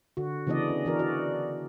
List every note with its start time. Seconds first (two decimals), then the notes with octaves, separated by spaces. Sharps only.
0.17 D3 F#4
0.47 C#3 E3 B3 D4 D5 D#5
0.69 C#4
0.85 E3 D4 F#4 A#4
0.99 F#4 D5 D#5